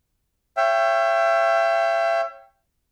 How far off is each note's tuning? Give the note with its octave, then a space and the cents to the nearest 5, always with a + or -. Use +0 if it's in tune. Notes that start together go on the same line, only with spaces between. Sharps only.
C#5 -15 E5 +35 G5 +0